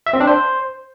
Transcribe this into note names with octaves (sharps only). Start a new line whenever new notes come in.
E5
C4
D4
C5